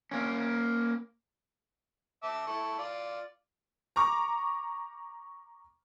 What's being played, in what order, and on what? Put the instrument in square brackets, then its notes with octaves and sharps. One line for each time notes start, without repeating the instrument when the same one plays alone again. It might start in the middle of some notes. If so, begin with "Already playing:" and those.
[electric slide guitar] A#3 C#4
[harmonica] E5 A5 D6
E4 A4 C#6
F4 D5
[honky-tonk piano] A#5 C#6 D6